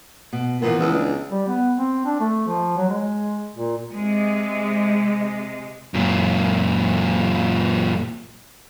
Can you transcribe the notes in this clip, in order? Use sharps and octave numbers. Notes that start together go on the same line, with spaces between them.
B2
A#2 E3 F3 B3
C#2
D4 G#4
G3
B3
C4
D4
A3
F3
F#3
G#3
A#2
C3 G#3
F#2 A#2